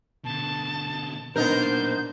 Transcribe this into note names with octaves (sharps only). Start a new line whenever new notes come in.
B2 D3 A5
B1 A#2 B3 D4 D#4 A#4 C5 G6